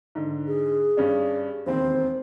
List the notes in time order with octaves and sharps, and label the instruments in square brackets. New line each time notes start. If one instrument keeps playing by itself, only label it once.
[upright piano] G#2 D3
[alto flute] G#4
[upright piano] G2 C#4 D4
[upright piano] E1 D#2 C4 [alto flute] C5